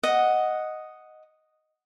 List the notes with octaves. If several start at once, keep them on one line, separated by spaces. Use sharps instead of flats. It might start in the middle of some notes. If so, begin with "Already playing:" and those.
D#5 F#5